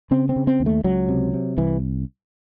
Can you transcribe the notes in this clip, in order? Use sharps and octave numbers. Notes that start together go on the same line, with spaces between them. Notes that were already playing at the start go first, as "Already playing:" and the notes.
C#3 C4
C4
C#3
C4
D#2
A3
C#2 F#3
C3
C3
C2 E3